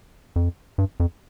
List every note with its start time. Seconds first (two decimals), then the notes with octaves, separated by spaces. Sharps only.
0.36 F2
0.78 G2
1.00 F2